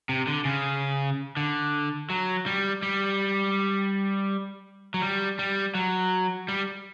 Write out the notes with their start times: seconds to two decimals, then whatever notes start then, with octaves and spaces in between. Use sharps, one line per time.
0.09 C3
0.27 D3
0.45 C#3
1.37 D3
2.10 F#3
2.46 G3
2.83 G3
4.94 F#3
5.02 G3
5.39 G3
5.75 F#3
6.48 G3